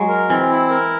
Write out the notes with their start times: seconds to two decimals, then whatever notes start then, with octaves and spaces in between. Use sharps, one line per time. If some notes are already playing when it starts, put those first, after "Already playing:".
Already playing: F#3 G#3
0.09 A#4
0.30 E3 C4
0.50 E4
0.70 A#4